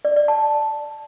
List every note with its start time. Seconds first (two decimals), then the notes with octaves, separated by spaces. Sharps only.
0.05 D5
0.16 D5
0.28 A5